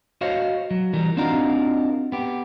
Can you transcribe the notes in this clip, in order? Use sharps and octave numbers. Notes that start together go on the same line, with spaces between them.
F#4 C5 C#5 D#5 F5
F#3
E3 G3 A#4
C4 D4 D#4 F4 F#4 A#4
B3 G4